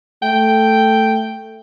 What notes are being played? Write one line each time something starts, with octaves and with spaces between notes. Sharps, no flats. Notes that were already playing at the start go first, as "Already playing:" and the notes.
A3 G5